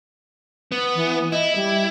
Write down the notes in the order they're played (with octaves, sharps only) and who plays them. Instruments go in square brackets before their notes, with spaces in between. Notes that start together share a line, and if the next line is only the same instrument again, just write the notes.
[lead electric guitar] B3
[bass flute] E3
[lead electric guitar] E4 [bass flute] D#5
[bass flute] G3